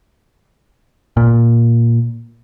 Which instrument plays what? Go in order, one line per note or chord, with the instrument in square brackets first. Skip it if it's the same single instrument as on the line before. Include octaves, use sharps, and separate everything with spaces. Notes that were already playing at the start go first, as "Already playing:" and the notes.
[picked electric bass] A#2